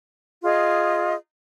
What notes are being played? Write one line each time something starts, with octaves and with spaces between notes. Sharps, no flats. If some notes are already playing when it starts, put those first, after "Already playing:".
F4 G#4 D#5